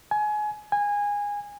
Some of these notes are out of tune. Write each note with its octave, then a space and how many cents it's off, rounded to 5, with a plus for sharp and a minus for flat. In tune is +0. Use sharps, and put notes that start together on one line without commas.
G#5 +25
G#5 -20